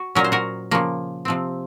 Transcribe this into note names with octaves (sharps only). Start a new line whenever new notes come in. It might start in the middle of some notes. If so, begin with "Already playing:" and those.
Already playing: F#4
A#2 F#3 C#4 A#4
C5
F#4 A#4
C#3 F3 A#3
C3 F3 C4